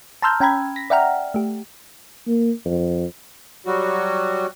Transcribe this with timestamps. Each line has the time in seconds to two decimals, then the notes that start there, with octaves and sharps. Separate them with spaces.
0.22 A5 A#5 C6 E6 F6 G6
0.40 C#4 G5 A#5 B5 G#6
0.76 A#6 B6
0.90 D5 E5 F#5 G5 A#5 F6
1.34 A3 G4
2.27 A#3
2.66 F2
3.66 F#3 G3 F#4